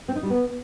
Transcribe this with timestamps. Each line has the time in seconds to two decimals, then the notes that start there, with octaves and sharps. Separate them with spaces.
0.08 C4
0.16 D#4
0.23 G3
0.30 B3